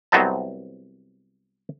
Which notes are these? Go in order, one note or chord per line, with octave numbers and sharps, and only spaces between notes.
C2 F#3 B3 C4 D#5 A5